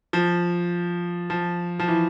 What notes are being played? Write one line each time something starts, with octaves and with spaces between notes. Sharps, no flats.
F3
F3
F3
E3